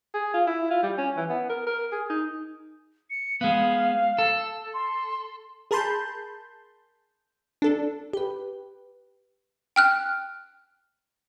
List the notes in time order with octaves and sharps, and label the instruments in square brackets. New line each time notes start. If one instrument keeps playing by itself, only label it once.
[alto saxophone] G#4
F4
E4
F4
G3
C#4
E3
B3
A#4
A#4
G#4
D#4
[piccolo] C#7
[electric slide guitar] G#3 B3 [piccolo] F5
[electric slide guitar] A4
[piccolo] C6
[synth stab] G#4 A#4 A5 B5 C6 G6
D4 A4
[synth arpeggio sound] G4 B4
[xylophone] G5 F6 F#6